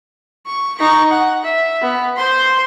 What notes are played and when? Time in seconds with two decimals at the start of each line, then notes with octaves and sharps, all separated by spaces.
0.47 C#6
0.78 D#4 C#6
1.11 F#5
1.44 E5
1.82 B3
2.17 C5 C6